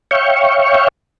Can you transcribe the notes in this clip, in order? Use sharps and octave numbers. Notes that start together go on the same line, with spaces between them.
C#5 E5 F5 G5 C#6